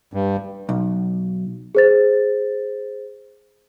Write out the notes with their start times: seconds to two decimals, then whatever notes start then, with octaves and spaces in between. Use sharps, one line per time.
0.13 G2
0.69 B1
1.75 G#4 C5 A6